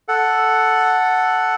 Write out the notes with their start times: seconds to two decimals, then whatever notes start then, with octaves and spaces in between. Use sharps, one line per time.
0.08 A4 F#5